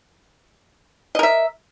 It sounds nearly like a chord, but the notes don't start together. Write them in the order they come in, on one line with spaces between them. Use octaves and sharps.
D#5 A#4 E5